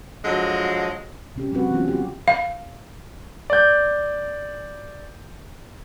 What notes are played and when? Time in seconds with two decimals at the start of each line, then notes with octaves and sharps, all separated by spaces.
0.25 D3 F3 F#3 G#3
1.36 C3 C#4 G4
1.52 F#3 G#3 C4 F#4 B4
1.71 E3 B3 C#4 F4
1.88 F4 G4
2.28 F5
3.50 D5 G6